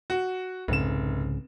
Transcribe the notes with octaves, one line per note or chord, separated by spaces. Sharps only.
F#4
F1 C2 G#2 C#3 E7